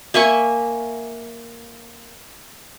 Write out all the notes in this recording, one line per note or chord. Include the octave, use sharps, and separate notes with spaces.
A#3 E5 G#5 C#6